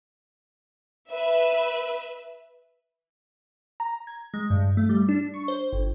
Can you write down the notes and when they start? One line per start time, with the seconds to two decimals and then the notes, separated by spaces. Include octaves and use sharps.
1.11 B4 E5
3.80 A#5
4.07 G#6
4.34 G#3
4.50 G2
4.77 A3
4.89 G3
5.09 D4
5.34 C#6
5.48 C5
5.72 G1